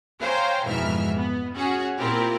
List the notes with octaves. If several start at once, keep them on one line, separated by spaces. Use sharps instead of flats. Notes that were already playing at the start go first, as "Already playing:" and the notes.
C5 C#5 F5 G5 G#5 A#5
F2 G#2 B2 E3 E5 F6
B3
C#4 F#4 G#4 F#5
A#2 C4 E4 F4 G4 A#4